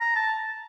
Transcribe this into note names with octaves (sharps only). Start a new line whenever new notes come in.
A#5
A5